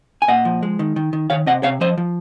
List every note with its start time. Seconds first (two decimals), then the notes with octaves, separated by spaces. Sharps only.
0.22 G#5
0.28 A#2 D#5 F#5
0.45 F3
0.63 G#3
0.79 D#3
0.96 D#3
1.13 D#3
1.30 D#3 C#5 F5
1.47 C3 D#5 F#5
1.63 C3 C#5 F5
1.81 F3 C5 D#5
1.98 F3